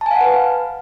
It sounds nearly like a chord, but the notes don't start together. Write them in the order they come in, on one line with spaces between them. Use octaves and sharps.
A5 G#5 F5 F#5 B4